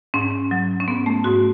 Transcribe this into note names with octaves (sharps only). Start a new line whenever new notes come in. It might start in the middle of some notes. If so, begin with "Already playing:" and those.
G#2 C#4
F#3
C#4
G#2 B3
A3
G#2 F#4